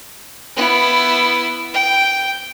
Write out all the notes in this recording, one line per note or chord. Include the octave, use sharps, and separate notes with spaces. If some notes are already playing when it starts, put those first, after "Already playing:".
B3 E4
G5